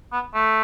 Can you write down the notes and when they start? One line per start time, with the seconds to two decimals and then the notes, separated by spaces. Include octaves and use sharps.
0.12 B3
0.35 A3